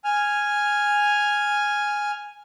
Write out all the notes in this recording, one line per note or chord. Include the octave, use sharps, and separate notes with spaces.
G#5 F6